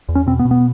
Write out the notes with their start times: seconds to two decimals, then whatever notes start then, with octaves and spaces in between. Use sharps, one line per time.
0.09 E2
0.15 C#4
0.27 B2 C4
0.39 B3
0.45 B2
0.51 B3